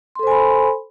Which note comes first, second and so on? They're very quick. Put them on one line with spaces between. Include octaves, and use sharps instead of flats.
C6 A4 C5 G#5 B5